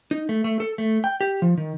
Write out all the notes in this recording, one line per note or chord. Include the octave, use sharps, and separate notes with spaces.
D#4
A3
A3
A4
A3
G5
G4
F3
D#3